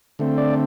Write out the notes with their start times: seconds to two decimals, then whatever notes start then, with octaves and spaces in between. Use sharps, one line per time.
0.19 D3 A3 C4
0.38 D5